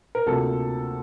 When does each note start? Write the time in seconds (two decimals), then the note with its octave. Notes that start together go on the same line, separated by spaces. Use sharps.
0.15 A#4
0.26 D2 C3 F3 A#3 A4